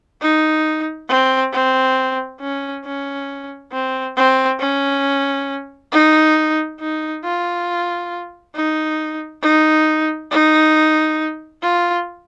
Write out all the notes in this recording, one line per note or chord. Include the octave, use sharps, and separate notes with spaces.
D#4
C4
C4
C#4
C#4
C4
C4
C#4
D#4
D#4
F4
D#4
D#4
D#4
F4